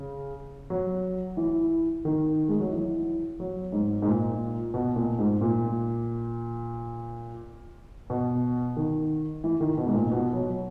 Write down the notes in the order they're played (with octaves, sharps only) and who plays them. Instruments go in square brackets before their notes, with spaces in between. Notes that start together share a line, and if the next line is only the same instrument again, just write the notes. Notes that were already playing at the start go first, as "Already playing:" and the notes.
Already playing: [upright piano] C#3
F#3
E3
D#3
G#3
F#3
E3
F#3
G#2
G#2
A#2
B2
A#2
G#2
A#2
B2
D#3
E3
D#3
B2
G#2
A#2
B2
F#3